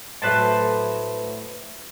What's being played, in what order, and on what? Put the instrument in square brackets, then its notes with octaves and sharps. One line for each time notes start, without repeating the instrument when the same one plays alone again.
[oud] A2 F#3 A3 [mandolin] B4 C5 A5